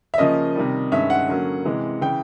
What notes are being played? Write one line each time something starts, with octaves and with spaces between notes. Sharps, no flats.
E5
C#3 F3 A#3 C#4 D#5
C3 D#3 G3
G2 D#3 G#3 C#4 E5
F#5
D3 F#3 A#3 C#4
C3 E3 G#3
C#3 E3 G5